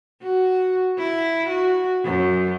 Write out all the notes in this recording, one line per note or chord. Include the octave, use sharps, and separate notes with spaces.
F#4
E4
F#4
F#2